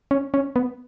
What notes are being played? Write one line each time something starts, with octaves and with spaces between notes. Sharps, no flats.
C#4
C#4
B3